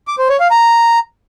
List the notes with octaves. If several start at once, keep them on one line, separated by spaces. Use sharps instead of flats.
D6
C5
C#5
F5
A#5